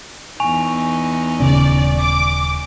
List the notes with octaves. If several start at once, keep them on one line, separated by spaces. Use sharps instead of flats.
E2 D#4 G#5 C#6 F7
D#1 C#3 C#4 D5
D6